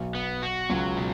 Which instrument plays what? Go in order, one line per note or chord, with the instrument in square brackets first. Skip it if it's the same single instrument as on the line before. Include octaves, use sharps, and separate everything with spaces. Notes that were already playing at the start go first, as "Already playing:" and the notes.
Already playing: [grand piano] B1 B2
[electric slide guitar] B3
F#4
[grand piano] C#2 C#3 [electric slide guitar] F#3
[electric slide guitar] B2